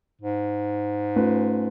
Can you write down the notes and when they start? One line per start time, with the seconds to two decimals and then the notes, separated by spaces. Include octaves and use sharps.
0.22 G#2
1.16 A3 C#4 F4 B4